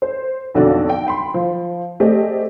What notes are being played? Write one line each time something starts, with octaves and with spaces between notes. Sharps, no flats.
C5
B1 F2 D3 F#4 A4 D5
G5
G5 B5 C6
F3
A3 C4 G4 G#4 D5 D#5